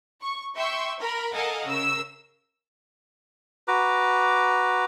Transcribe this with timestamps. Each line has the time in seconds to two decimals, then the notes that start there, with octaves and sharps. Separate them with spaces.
0.21 C#6
0.55 E5 G5 C6 C#6 E6
0.99 A#4 B5
1.33 A4 A#4 D#5 F5 F#5 G#5
1.66 C#3 A#4 E6
3.68 F#4 B4 A#5 D6